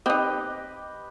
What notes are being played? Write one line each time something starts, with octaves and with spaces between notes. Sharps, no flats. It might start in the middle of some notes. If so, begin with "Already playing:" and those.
C4 D#4 G4 B4 D#5